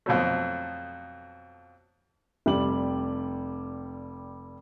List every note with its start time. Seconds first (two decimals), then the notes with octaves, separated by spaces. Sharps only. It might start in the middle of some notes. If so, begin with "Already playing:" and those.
0.06 F2 B2 F#3 A3
2.46 F1 G3 G4 F#7